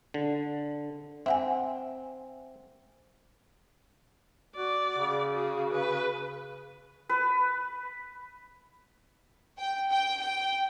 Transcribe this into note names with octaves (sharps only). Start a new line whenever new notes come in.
D3
C4 E5 F#5 G#5
F#4 D5
C#3
F#4 G#4
B4
B4
G5
G5
G5